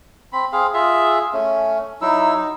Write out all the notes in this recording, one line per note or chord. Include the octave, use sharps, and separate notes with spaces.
C4 B5
C4 G#4 F5
F4 G#4 E5
A3 C#4
F#3 D#4 E4 E6
D#4